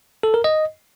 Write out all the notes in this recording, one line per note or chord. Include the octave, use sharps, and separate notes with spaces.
A4
A#4
D#5